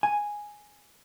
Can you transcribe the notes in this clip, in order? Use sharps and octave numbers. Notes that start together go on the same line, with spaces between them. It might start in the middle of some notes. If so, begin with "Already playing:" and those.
G#5